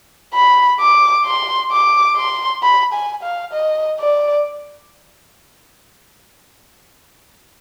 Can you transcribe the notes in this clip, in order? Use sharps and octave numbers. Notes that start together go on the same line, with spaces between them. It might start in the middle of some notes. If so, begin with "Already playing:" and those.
B5
D6
C6
D6
C6
B5
G#5
F5
D#5
D5